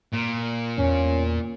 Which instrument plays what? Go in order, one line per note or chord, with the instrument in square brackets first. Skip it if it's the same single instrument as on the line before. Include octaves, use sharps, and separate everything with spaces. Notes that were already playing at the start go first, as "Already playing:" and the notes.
[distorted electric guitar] A#2
[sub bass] E2 [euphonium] C#4